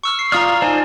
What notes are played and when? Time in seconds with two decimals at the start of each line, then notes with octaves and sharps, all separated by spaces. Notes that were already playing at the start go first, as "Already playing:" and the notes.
0.04 C#6 E6 F6
0.19 C7
0.32 F4 D5 F5 A#5 D#6 F6
0.62 D#4 C5 D5 G#5 A5